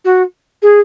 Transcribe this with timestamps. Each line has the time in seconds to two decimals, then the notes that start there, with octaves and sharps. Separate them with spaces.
0.05 F#4
0.62 G#4